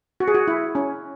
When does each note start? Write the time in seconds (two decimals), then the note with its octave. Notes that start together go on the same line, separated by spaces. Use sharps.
0.20 F#4
0.28 G#4
0.35 F#4
0.48 E4
0.75 C#4